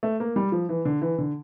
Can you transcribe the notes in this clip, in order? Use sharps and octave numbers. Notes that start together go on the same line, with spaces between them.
A3
A#3
G3
F3
E3
D3
E3
D3